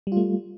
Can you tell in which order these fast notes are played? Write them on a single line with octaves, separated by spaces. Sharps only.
G3 F4 A3